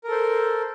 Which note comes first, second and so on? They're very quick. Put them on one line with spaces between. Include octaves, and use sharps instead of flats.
A#4 A4 C5